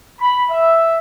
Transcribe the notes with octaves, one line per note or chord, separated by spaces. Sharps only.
B5
E5